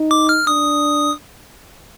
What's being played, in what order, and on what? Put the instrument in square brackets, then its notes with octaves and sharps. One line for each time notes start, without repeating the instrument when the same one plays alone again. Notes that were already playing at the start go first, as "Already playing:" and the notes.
Already playing: [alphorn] D#4
[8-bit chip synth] D6
F6
[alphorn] D4 [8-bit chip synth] D#6